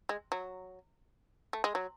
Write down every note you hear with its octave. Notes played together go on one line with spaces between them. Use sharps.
G#3
F#3
A3
G#3
F#3